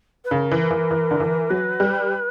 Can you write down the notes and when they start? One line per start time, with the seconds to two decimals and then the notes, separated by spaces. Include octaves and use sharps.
0.25 B4
0.31 C#3 A#4
0.51 E3
0.71 E3
0.91 E3
1.11 D3
1.20 E3
1.50 F#3 B4
1.80 G3